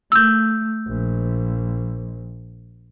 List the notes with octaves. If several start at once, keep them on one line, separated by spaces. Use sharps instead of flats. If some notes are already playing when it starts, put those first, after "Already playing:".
A3 E6 G6
A#1